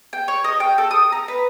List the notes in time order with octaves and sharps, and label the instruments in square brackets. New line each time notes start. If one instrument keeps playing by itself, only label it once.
[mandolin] G5
C#5
D#5
G5
A4
D#6
A#5
B4